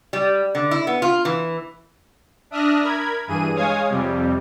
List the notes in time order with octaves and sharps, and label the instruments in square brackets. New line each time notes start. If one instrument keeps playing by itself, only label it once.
[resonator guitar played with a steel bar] G3
D3
E4
B3
F4
E3
[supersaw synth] D4 E5 D#6 F6 F#6 A#6
A#4 B5 G#6
G2 E3 G#4 D#7
G#3 C#5 F5 G#5 D#6 G#6
F2 C3 G3